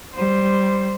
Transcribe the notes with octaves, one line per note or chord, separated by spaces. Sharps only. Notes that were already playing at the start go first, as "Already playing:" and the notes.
G3 C5